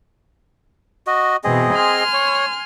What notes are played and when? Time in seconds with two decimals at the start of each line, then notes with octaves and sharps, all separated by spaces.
1.07 F#4 D#5
1.44 B2 E3 C4 G#4 D#5
1.73 G#5 C6 F6
2.13 C#5